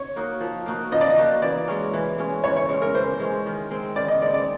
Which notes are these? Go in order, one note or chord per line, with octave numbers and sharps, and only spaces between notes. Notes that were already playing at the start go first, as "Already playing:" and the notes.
Already playing: C#5
A#3 D#4 F#4
F3
A#3 D#4 F#4
F3 D#5
D5
D#5
A#3 D#4 F#4
E3 D5
G#3 C#4
E3
G#3 C#4
E3 C#5
C#5
G#3 C#4
A#4
E3 C5
G#3 C#4
D#3
G#3 C4
D#3 D5
D#5
G#3 C4 D5
D5